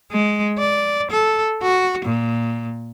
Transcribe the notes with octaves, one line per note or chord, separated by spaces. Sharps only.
G#3
D5
A4
F#4
A#2